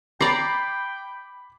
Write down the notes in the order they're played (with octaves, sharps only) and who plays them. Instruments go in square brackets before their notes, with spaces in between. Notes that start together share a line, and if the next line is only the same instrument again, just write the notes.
[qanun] D5 A#5 [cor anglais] G5 [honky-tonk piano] B5 D6 C7